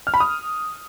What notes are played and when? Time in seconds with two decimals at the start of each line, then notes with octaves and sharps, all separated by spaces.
0.07 F6
0.14 B5
0.20 D#6